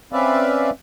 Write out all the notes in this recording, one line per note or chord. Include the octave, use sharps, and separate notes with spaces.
C4 C#4 B4 D5 E5 F5